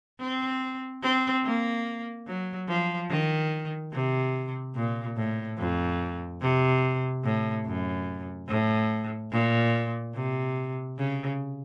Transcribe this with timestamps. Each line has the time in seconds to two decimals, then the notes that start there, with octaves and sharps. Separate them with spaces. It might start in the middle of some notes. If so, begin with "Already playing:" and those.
0.20 C4
1.03 C4
1.44 A#3
2.27 F#3
2.68 F3
3.10 D#3
3.92 C3
4.76 A#2
5.17 A2
5.58 F2
6.41 C3
7.24 A2
7.65 F#2
8.49 A2
9.31 A#2
10.14 C3
10.98 C#3